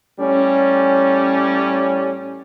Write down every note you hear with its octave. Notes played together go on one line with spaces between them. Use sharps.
A2 G3 C#4